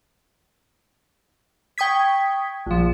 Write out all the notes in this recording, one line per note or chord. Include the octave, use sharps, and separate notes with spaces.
G5 C#6 D#6 G#6 B6
A#1 F3